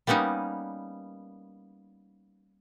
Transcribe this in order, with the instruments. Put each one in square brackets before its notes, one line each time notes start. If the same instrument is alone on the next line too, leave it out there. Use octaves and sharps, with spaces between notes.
[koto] G3 A#3 B3 C#4 D#4